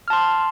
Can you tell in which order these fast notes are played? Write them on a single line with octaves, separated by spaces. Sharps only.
F6 A5 C6